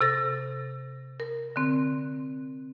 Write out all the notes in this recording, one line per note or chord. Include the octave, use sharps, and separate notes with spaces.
C3 A4 A6 A#6
A#4
D3 C4